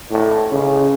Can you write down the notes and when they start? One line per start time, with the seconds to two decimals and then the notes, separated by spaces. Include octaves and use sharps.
0.10 A2
0.51 C#3